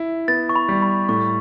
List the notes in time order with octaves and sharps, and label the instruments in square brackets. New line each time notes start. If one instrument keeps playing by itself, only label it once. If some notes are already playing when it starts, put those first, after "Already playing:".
Already playing: [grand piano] E4
[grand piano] B3 [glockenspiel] A6
[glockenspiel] C#6
B5
[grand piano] G3
[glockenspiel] B5
[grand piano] A2 [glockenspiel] C#6